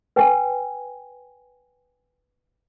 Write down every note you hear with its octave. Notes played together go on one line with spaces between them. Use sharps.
B4 G5 G#5